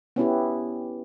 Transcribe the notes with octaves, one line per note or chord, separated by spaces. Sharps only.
B3 C#4 E4 G4